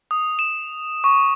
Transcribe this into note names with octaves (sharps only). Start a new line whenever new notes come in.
D#6
E7
C#6